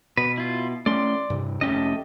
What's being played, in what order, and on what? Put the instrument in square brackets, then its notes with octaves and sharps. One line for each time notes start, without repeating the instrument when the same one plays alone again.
[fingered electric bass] B2 [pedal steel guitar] B4
[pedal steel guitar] E4 F4
[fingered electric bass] A3 C#4 [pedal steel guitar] D5 C6
[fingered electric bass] G2 C3
[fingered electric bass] F1 C#4 [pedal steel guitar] A3 G4 D#5